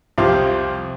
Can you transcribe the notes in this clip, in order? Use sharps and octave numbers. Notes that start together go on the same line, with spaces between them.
C2 F2 C4 G4 C5 F5